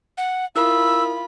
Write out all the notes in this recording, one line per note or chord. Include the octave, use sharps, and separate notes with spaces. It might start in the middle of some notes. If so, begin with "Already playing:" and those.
F#5
E4 F4 A#4 B5 D#6 E6